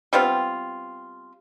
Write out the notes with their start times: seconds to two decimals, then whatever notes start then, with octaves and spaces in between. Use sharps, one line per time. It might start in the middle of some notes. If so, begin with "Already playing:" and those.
0.13 G3 B3 C4 F4